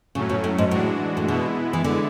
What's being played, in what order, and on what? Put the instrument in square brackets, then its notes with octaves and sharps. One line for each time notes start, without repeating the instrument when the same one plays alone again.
[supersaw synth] A2 F#3 A3 C#4 [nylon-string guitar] C#3
[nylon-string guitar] B2
A2
G#2
[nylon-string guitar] A2 [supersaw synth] E3 G#3 D4 F#4
[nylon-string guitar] A2
[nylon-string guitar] B2 [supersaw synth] G#3 B3 E4
[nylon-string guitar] E3
D3